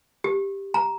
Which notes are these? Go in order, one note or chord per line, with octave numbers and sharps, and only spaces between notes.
G4
A#5